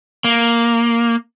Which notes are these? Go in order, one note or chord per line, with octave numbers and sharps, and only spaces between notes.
A#3